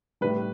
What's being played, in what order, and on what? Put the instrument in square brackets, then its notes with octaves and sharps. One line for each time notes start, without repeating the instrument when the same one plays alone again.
[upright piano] A2 G3 B4